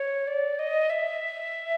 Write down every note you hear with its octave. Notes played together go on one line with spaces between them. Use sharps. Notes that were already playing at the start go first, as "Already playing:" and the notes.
Already playing: C#5
D5
D#5
E5